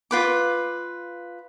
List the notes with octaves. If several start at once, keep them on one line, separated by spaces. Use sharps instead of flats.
F4 B4 D6